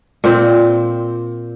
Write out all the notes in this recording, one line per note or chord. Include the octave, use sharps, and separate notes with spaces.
A#2 C4